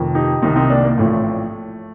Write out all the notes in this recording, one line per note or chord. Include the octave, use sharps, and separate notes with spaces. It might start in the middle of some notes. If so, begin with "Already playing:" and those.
Already playing: F1 F2 D#3
D#4 G4
C2 C3 D#3 C4 D#4
C4 D#4
A#3 D4
A#3
A1 A2 F3 A3